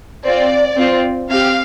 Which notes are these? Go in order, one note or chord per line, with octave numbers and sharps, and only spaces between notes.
C4 F4 D5
C4 F4
C4 G4 F5